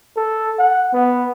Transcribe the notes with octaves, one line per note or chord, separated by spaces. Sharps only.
A4
F#5
B3